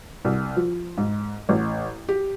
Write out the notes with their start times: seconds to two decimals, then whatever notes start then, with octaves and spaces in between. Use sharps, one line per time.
0.25 C2
0.57 F3
0.98 G#2
1.49 A1
2.09 G4